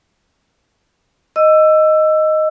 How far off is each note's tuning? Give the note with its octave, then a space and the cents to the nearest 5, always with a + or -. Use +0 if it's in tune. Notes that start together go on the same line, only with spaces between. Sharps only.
D#5 +0 E6 +15